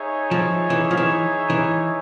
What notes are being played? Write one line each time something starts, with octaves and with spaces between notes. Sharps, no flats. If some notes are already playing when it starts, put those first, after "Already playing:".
Already playing: D#4 G#4 C#5 E5
F3
E3
F3
E3
E3